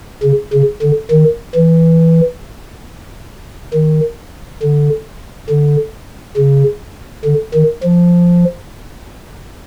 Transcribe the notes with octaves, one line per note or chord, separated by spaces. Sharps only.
C#3
C#3
D3
D#3
E3
D#3
D3
D3
C#3
D3
D#3
F3